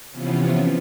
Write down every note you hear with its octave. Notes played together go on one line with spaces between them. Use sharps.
C3 E3 F3 B3 C#4 F4